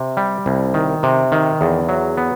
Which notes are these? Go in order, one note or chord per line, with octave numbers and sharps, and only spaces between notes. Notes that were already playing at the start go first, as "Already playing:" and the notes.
Already playing: C3
G3
C2
D#3
C3
D#3
E2
F#3
B3